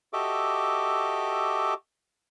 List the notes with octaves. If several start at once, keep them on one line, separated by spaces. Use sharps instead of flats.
F#4 G4 A4 D#5 E5 D6